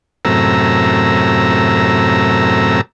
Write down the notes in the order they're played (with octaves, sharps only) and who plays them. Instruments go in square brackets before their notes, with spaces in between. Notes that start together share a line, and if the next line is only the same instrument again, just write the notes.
[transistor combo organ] F#2 A2 C3 A#5 E6